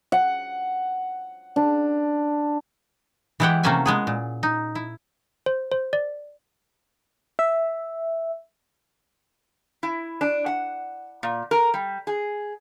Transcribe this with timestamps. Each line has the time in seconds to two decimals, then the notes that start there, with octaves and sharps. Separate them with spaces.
0.12 F#5
1.56 D4
3.40 E3 G#3 E4 G4 F#5 G5
3.63 C3 A3 A#3 C#4 E5 G#5
3.86 G#3 B3 G#4
4.07 A#2
4.43 D#4
4.75 E4
5.46 C5
5.72 C5
5.93 D5
7.39 E5
9.83 E4
10.21 D4
10.46 F#5
11.23 A#2
11.51 A#4
11.74 G3
12.07 G#4